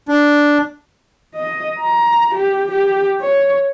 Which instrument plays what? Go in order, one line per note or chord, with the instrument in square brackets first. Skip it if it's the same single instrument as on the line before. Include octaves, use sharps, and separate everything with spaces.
[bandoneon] D4
[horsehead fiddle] D#5
A#5
G4
G4
C#5